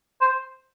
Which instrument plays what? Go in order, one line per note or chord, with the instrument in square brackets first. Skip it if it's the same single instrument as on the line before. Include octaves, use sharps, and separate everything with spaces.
[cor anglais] C5